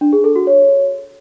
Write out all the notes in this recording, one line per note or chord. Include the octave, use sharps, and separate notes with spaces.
D4
G#4
A4
F#4
C#5